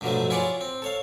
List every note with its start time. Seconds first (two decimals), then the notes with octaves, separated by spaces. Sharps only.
0.01 G2 B2 D3 F3 F#3 A3
0.30 E4 F4 G#4 C#5 D5 F#5
0.61 C4
0.82 A4 C#5 F5